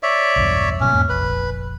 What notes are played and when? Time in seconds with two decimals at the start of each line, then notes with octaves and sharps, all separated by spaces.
0.03 C#5 D5 E5
0.36 B1 E2 G2
0.80 G#2 B2 F#3 C#4
0.93 E2 G#2 A#3
1.09 F1 A#1 B4